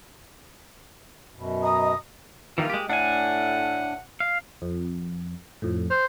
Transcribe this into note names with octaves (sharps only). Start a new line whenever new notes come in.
F#2 B2
D#5 A#5 D#6
D#3 E3 G3 A#3 F4
G#3 G4
A2 D4 F#5 G#5
F5
F2
F2 A2
C5 F6